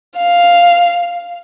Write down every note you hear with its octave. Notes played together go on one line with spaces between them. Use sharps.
F5